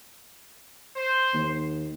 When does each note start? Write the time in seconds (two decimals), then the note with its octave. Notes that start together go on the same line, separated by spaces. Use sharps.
0.96 C5
1.34 D#2